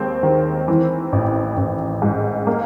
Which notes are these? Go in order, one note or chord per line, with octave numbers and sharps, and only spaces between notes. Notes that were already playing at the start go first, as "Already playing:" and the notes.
Already playing: D#2 G#3 C4
D#3
E3
A1
A1
G#2
A#3